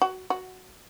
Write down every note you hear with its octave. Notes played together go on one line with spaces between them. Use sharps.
F#4
F#4